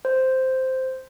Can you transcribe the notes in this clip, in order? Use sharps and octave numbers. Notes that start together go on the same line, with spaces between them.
C5